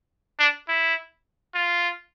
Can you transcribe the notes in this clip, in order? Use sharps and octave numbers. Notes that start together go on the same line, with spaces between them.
D4
E4
F4